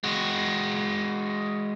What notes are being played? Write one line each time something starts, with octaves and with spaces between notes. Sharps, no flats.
G#3 F#4